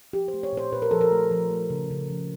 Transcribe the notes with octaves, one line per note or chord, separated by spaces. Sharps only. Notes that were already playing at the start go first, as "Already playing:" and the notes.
F3 G4
C5
A3
C#5
A#2 C5
A#2 B4
A#4
F3 A4
A#4
A3
F3
A3
C#3
C#3
F3